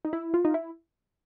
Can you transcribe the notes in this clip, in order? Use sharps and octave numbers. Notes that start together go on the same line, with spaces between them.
D#4
E4
F4
D#4
E4